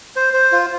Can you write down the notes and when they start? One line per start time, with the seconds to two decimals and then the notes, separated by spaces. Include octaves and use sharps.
0.16 C5
0.34 C5
0.52 F4